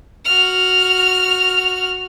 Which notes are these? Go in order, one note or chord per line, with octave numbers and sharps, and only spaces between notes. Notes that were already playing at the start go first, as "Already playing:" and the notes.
F#4 F6